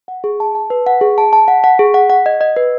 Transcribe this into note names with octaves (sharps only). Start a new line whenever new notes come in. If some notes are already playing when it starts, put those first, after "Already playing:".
F#5
G#4
A5
A5
B4
F#5
G#4
A5
A5
F#5
F#5
G#4
F#5
F#5
D#5
D#5
B4